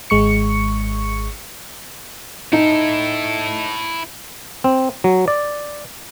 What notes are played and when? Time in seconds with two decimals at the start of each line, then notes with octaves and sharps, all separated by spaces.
0.10 G#1 G#3 C#6 C#7
2.53 D#4 E4 A4
4.64 C4
5.04 F#3
5.28 D5